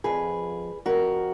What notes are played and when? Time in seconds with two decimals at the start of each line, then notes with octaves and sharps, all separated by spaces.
0.04 F2 F3 G#4 B4
0.85 F2 F3 F#4 A#4